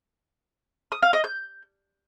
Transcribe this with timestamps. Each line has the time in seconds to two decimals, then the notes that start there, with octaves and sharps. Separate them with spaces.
0.92 D#6
1.02 F5
1.13 D#5
1.24 G6